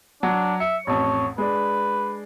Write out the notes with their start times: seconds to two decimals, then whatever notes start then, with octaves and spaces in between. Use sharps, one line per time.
0.23 F#3 D4
0.60 E5 C#7
0.87 A1 F2 C#5
1.38 G#3 D4 B4